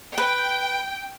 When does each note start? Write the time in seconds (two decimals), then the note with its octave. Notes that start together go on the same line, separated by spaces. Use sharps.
0.18 B4 G5